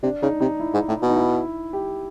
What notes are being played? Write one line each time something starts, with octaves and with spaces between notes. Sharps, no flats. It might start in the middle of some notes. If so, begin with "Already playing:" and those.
C3 D4
C#3 D#4
C3 D#4
E4
G#2
A2
B2
D#4
E4
G4